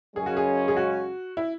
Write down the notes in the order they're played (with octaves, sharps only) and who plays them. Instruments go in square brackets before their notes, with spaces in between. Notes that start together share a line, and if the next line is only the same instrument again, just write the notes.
[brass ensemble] F#2 C#3 G#3 C#4 [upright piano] G#4
[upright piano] F#4
G#4
G#4
F#4
E4